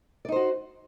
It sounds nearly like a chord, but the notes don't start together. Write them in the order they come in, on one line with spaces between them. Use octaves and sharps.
D5 D#4 C5 F#4